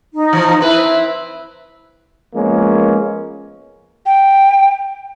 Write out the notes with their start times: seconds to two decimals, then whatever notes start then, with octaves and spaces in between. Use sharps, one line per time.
0.13 D#4
0.33 E3 F3
0.61 C4 E4 B4
2.35 F3 G#3 A#3 B3 C#4
4.06 G5